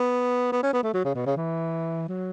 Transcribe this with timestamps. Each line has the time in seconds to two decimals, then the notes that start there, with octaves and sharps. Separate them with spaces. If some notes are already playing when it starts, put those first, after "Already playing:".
Already playing: B3
0.52 B3
0.63 C#4
0.73 B3
0.83 A3
0.94 F#3
1.04 C#3
1.15 B2
1.26 C#3
1.36 E3
2.08 F#3